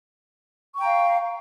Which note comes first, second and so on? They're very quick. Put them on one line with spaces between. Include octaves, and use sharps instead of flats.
C#6 G5 A#5 F5